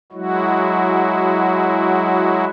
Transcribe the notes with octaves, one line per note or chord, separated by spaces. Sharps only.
F#3 G#3 E4 F#4